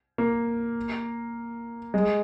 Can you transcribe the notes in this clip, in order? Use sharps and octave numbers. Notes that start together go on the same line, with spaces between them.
A#3
G#3